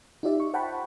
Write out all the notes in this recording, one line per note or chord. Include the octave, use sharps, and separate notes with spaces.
D#4 F4 G4 D5 E5
C#6
C5 F#5 G5 A5 B5 C#6